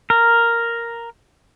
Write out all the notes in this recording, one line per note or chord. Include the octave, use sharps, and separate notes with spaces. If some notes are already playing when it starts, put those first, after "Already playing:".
A#4